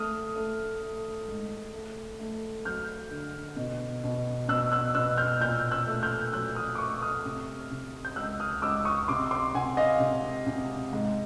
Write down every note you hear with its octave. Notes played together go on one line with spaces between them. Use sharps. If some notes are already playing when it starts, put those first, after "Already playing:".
Already playing: A3 D#6 F6
A3
A3
G#2
A3
A3
F#3 F6 G6
D3
B2
B2
B2 E6 F#6
E6 F#6
B2 E6 F#6
F6 G6
A#2 F6 G6
E6 F#6
A3
F6 G6
F#3 E6 F#6
D#6 F6
D6
A3 C#6 D#6
D#6 F6
C3
C3
G6
C#2 E6 F#6
D#6 F6
C#2 D6 E6
C#6 D#6
C3 C6 D6
C6 D6
C3 F#5 G#5
D#5 F5
C3
C3
G#2